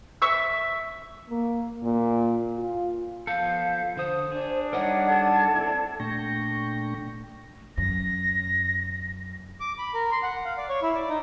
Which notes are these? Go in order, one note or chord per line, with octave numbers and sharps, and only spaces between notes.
E5 C#6 E6
A#3
A#2
F4
F3 B3 A4 F5 G6
D3 C5 D#6
D4 G#4
G3 D#4 A#4 C#5 D#5 E5 F#5
A4 A5 G#6
C4 E4 D5
A#2 A3 D4 G5 C#6 A#6
F#2 A#6
D6
B5
A#4
C6
F#5
F5
D5
C#5
E4
D5
D#4